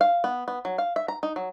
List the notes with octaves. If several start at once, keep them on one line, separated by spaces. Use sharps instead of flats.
F5
B3
B3
F#3
F5
E5
A#5
D#4
F#3